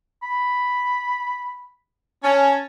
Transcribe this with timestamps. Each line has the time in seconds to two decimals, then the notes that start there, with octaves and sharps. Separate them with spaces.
0.23 B5
2.24 C#4 A5